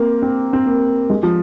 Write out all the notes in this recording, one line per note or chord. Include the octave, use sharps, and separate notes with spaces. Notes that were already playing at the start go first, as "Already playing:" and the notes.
Already playing: A#3 C4
C4
C4
A#3
G#3
F3